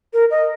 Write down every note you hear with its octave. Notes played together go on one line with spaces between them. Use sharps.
A#4
D#5